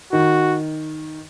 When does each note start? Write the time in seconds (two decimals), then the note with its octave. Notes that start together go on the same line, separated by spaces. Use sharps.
0.13 D#3 F#4